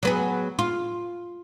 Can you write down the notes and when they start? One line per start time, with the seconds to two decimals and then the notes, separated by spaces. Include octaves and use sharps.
0.03 F#3 B3 G#4
0.59 F4